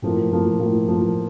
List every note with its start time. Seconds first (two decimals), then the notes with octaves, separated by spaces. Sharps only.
0.02 A2 F3 A#3
0.31 A2 F3 A#3
0.60 A2 F3 A#3
0.88 A2 F3 A#3